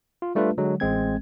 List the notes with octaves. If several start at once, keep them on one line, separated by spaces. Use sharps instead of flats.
F4
G3 A3 D4 F4 B4
D3 F#3 G#3
A1 G#3 C4 G#6